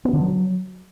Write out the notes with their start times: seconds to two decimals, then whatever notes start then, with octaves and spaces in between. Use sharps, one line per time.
0.05 B3
0.13 D3
0.21 F#3